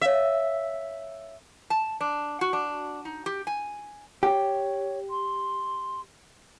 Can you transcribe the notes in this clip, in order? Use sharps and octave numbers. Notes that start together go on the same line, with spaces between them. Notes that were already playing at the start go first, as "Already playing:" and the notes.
C#5 E5 F5
A5
D4
F#4
D4
D#4
G4
G#5
G4 C#5
C6